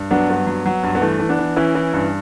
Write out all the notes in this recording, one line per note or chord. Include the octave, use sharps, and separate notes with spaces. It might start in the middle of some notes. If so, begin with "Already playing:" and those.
Already playing: G2
F#3 B3 D4
G2 B3
F#3
F#3
G2
B3
E3 A3
E3
B3 D4
E3
E3 C#4 E4
E3
G2